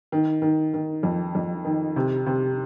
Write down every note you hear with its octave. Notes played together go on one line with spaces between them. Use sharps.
D#3
D#3
D#3
F2
F2
D#3
C3
C3